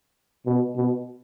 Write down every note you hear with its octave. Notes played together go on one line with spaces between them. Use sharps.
B2
B2